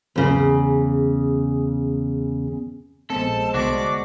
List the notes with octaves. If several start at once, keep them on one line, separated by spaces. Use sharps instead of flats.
E2 C#3
A#1 G#3 B3 C4 A4 C5 A5
C2 D3 B3 D4 F#4 D6